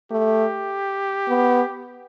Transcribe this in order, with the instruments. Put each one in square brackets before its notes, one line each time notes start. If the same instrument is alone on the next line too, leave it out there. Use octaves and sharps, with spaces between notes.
[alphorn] A3 [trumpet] G4
[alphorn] B3